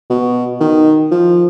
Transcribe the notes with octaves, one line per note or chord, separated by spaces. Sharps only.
B2
D#3
F3